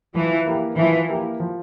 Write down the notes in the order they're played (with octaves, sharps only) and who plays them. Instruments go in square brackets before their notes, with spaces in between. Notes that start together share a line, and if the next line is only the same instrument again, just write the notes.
[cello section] E3 [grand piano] F3
[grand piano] A#3 E4 G4 A#4
[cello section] E3 [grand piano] F3
[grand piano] A#3 E4 G4 A#4
F3